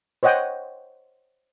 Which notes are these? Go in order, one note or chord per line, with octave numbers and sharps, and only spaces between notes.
C5 C#5 D#5 F#5 G5 D#6